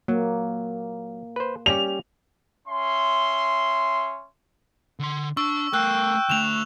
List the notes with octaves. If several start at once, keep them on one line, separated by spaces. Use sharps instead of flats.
F#3 A#3
B4 C5
G3 C#4 G4 F7
C#4 E5 C6
D3 C6
D4 C#6 E6
A3 A#4 G5 E6 F#6
D2 A3 E7 F7